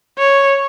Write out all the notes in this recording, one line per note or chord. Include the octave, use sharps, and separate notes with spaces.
C#5